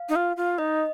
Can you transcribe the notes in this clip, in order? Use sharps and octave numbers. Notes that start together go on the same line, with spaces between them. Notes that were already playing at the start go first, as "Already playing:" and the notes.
Already playing: F5
D#4
F4
F4
D#4 D#5